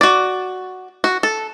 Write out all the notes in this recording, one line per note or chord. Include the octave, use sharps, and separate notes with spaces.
F#4 D5
F#4
A4